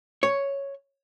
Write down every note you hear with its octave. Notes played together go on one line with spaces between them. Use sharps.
C#5